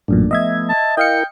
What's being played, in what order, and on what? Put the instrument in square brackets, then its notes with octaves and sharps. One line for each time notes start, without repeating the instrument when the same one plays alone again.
[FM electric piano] A1 F#2 A#2 [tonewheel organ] A3 D4
[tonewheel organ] F3 A3 B3 [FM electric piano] D#5 E5 G#6
[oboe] A5
[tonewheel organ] E4 A#4 [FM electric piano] D#5 F5 C#7 [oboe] G5